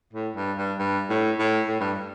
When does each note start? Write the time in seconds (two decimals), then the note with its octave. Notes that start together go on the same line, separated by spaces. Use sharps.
0.13 A2
0.36 G2
0.58 G2
0.79 G2
1.10 A2
1.39 A2
1.68 A2
1.80 G2